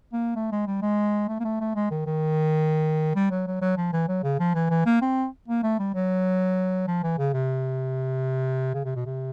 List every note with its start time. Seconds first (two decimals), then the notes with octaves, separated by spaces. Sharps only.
0.13 A#3
0.36 A3
0.52 G#3
0.67 G3
0.82 G#3
1.29 A3
1.40 A#3
1.44 A3
1.61 A3
1.75 G#3
1.91 D#3
2.06 D#3
3.16 G3
3.31 F#3
3.47 F#3
3.61 F#3
3.77 F3
3.93 E3
4.08 F#3
4.24 C#3
4.39 F3
4.54 E3
4.70 E3
4.86 A#3
5.02 C4
5.48 A#3
5.63 A3
5.79 G3
5.95 F#3
6.87 F3
7.03 E3
7.18 C#3
7.34 C3
8.74 C#3
8.85 C3
8.95 B2
9.06 C3